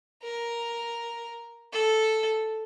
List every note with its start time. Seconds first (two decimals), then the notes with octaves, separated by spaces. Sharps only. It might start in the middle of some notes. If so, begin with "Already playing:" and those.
0.23 A#4
1.73 A4